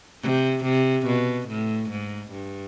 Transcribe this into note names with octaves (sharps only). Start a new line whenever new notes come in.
C3
C3
B2
A2
G#2
G2